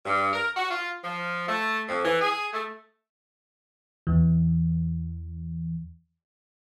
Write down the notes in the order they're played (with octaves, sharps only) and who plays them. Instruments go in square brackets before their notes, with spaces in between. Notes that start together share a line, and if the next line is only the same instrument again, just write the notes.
[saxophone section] G2
A#4
F#4
F4
F3
A3
F2
E3
G#4
A3
[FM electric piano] E2 E3